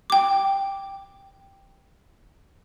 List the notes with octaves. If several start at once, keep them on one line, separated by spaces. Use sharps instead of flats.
G5 D6